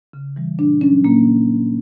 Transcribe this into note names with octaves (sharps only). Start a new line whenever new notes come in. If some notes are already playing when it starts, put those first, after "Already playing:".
C#3
E3 G3
A#2 D4
F#3 C#4
A#2 A#3